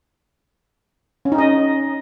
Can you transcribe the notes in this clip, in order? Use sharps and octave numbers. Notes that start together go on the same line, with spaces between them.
C#4
D#4
D#5